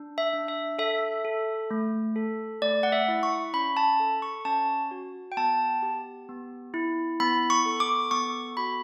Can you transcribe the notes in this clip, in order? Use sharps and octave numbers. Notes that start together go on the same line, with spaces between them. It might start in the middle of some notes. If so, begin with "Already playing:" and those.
Already playing: D4
E5
D4
E5
A4 E5
A4
A3
A4
A3 D5
F#5
E5
E4
C#6
C#4 B5
A5
A4
C#6
C#4 A5
F#4
G5
B3 A5
G4
B3
E4
B3 B5
C#6
A4
D6
B3 C#6
F#4 B5